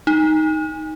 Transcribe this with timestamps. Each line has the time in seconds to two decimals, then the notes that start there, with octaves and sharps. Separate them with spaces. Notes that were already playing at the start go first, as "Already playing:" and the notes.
0.07 D#4